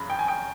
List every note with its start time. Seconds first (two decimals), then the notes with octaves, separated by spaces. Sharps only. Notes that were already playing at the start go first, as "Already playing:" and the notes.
Already playing: F#1 F#2 C#3 B5
0.10 G5
0.19 G#5
0.28 G5